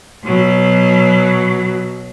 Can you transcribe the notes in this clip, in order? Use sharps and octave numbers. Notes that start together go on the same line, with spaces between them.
B2 F#3